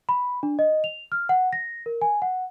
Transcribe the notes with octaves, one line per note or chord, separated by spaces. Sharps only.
B5
D4
D#5
F7
F6
F#5
A#6
A#4
G#5
F#5